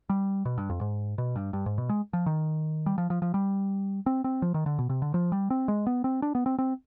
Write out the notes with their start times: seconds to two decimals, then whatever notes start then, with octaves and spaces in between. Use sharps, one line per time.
0.09 G3
0.45 B2
0.58 G2
0.69 F2
0.81 G#2
1.18 B2
1.36 G2
1.53 G2
1.66 G#2
1.78 B2
1.89 G#3
2.13 F3
2.26 D#3
2.86 G3
2.98 F3
3.10 F3
3.22 F3
3.34 G3
4.06 C4
4.24 C4
4.42 F3
4.54 D#3
4.66 D3
4.79 B2
4.89 C3
5.02 D3
5.14 F3
5.32 G3
5.50 C4
5.68 G#3
5.87 B3
6.04 C4
6.22 D4
6.35 B3
6.46 C4
6.58 C4